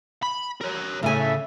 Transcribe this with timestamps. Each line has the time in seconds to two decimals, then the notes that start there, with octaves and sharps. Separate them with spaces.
0.23 B5
0.61 A#4 C#5
1.03 A2 C#3 D4 A4 E5 G#5